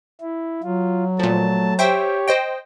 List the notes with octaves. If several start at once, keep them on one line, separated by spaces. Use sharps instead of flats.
E4
F#3 F4
A#2 F3 A3 A5
G4 C5 C#5 E5 G5
C5 D#5 G5